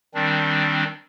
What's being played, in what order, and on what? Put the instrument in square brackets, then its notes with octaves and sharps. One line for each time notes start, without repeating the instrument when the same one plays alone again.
[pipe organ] D#3 G3 C4 D4